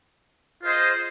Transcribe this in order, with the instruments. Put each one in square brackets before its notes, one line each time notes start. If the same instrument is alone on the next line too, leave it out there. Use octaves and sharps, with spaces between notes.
[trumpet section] F4 G#4 C5 D#5